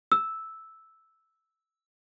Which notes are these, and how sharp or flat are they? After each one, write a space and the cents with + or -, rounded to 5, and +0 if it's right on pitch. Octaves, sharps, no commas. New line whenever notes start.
E6 -5